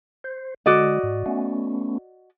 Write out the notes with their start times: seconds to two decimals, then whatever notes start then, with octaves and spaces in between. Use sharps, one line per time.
0.24 C5
0.66 D3 G#3 F#4 D5 D#5
1.03 G#2
1.26 A3 B3 C#4